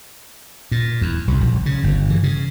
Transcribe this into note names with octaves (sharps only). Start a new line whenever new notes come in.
A#2
E2
C2
A#1
C#3
G1
E3
C#3